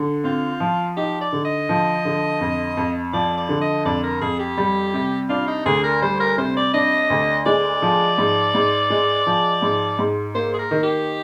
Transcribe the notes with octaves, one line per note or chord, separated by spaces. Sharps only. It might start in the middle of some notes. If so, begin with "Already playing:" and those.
Already playing: D3
C4 F4
F3
D#4 G4
D5
D3
D#5
F3
D3
F2
F2
F3 D5
D5
D3
D#5
F2 D5
A#4
F2 G#4
G4
G3
C3
D4 F4
D#4
D2 G#4
A#4
G3 C5
A#4
C3 C5
D5
D4 D#5
D2
G#3 D5
F3
G#2
G#2
G#3
F3
G#2
G#2
A#3 C5
G#4
A#4
D#3
G4